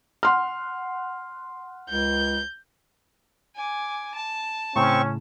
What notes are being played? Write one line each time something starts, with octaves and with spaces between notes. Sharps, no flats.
F#5 C6 F6
C#2 G6
G#5 D6
A5
A2 C#3 C4 C#4 C#6